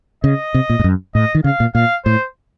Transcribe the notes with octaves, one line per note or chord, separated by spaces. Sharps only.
C#3 D#5
C3
A#2
A2
F#2
A2 D#5
D#3
C#3 F5
A#2
A#2 F5
A2 C5